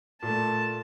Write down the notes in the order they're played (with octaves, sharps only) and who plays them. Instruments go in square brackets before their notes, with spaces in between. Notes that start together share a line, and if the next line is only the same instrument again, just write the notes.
[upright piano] A#2 A3 [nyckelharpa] A5